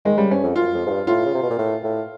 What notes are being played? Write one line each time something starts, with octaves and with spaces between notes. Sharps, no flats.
D#3 G#3
C#3 G3
G2 C#4
F2
F#2 F4
F2
G#2
G2
A2 F4
C#3
C3
B2
A#2
A2
A2